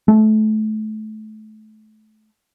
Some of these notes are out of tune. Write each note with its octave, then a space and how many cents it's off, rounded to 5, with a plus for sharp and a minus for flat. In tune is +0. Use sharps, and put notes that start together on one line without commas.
A3 -25